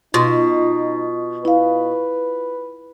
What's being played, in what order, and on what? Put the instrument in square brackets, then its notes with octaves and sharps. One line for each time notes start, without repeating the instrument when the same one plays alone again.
[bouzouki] B2 [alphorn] D#4 [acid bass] F4
[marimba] E4 F5 [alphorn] B4